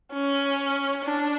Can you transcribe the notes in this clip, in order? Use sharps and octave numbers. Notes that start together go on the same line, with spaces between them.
C#4
D4